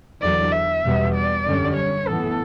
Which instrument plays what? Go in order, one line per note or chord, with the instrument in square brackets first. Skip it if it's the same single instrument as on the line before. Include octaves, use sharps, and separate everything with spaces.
[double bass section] E2 D3 F#3 [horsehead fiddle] D5
[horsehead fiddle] E5
[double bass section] E2 B2 G3 B3
[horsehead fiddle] D5
[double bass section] F#2 D3 G3 C#4
[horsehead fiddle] C#5
[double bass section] A2 E3 B3 [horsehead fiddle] A4